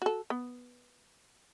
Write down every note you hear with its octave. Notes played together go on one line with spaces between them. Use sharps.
F#4 A4
B3